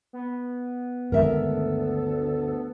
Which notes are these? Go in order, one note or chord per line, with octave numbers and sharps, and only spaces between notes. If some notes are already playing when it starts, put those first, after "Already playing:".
B3
D2 G2 D#3 G#3 A4 A#4 E5